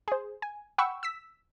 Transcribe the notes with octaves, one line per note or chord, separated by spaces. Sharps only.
G#4 C5
G#5
F#5 G5 B5 C#6 E6
E6 B6